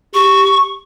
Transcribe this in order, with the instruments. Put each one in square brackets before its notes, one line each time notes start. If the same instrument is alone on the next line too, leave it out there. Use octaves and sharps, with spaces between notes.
[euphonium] G4 [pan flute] C#6